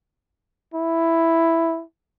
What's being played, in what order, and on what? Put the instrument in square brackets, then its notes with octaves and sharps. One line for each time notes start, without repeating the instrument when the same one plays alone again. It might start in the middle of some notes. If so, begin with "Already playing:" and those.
[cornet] E4